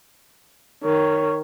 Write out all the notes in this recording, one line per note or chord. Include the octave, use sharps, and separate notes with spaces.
D#3 C#5